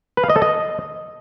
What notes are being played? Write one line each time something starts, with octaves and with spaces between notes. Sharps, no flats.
B4
F5
D#5
A4
D#5